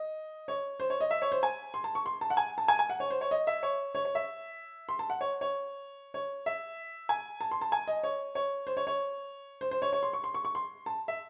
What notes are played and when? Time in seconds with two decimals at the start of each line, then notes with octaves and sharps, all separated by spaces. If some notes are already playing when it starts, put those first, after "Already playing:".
Already playing: D#5
0.48 C#5
0.80 C5
0.90 C#5
1.01 D#5
1.11 E5
1.22 C#5
1.32 C5
1.43 G#5
1.74 C6
1.84 A5
1.95 C#6
2.06 C6
2.21 A5
2.30 F#5
2.37 G#5
2.58 A5
2.68 G#5
2.79 G#5
2.90 F#5
3.00 C#5
3.11 C5
3.21 C#5
3.31 D#5
3.47 E5
3.63 C#5
3.95 C#5
4.05 C#5
4.15 E5
4.89 C6
4.99 A5
5.10 F#5
5.21 C#5
5.41 C#5
6.14 C#5
6.46 E5
7.09 G#5
7.41 A5
7.51 C6
7.61 A5
7.72 G#5
7.87 D#5
8.03 C#5
8.35 C#5
8.67 C5
8.77 C#5
8.87 C#5
9.61 C5
9.71 C5
9.82 C#5
9.93 C#5
10.03 C6
10.13 C#6
10.24 C6
10.34 C#6
10.45 C#6
10.55 C6
10.86 A5
11.08 E5